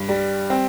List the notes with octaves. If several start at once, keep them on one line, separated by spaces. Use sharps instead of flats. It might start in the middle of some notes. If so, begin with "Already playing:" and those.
Already playing: G2
G3
C4